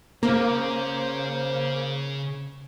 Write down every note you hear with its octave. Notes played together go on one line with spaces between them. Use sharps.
C#3 A#3 C5